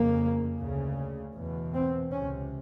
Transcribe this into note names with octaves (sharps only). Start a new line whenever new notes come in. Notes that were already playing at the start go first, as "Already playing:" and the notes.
Already playing: F2 C#3 A#3
D2 C#3
E2 B2
C4
C#2 C3 C#4